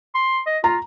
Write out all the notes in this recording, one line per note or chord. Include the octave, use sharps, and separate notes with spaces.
C6
D#5
F4 A#5